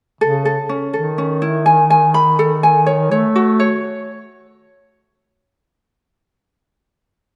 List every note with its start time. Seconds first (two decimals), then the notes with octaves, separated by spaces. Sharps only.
0.21 C#3 A4
0.45 A4
0.69 C#4
0.93 D#3 A4
1.18 C#4
1.42 E4
1.66 G#5
1.90 G#5
2.14 B5
2.39 A4
2.63 G#5
2.86 C#5
3.11 A3 C#5
3.35 F#4
3.60 C#5